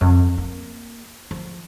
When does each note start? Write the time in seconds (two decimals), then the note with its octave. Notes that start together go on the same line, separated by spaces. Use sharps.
0.01 F2
0.38 A#3
1.31 F3